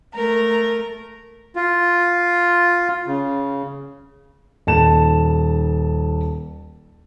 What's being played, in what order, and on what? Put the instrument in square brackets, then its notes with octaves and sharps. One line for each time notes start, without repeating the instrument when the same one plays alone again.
[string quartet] A3 A#4 A#5
[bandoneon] F4
C#3
[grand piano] D#1 A5 E7